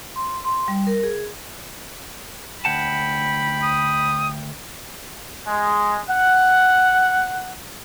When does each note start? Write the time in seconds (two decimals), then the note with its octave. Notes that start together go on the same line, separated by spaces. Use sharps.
0.16 C6
0.44 C6
0.68 G3
0.87 A#4
1.03 G#4
2.65 D2 F#5 G5 A5 B5
3.63 D#6
5.47 G#3
6.09 F#5